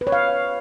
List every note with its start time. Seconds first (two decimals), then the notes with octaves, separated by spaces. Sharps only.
0.01 B4
0.07 C#5
0.12 F5